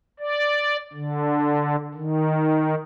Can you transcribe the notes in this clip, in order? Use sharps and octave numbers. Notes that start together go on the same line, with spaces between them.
D5
D3
D#3